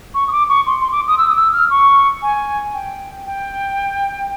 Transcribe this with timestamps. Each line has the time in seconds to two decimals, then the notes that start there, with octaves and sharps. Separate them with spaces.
0.14 C#6
0.28 D#6
0.32 D6
0.49 C#6
0.66 C6
0.80 C6
0.92 D6
1.07 D#6
1.18 E6
1.28 D#6
1.36 E6
1.53 F6
1.70 C#6
2.22 G#5
2.74 G5
3.26 G5